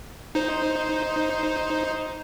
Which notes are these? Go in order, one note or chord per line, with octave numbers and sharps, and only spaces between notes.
D#4 C5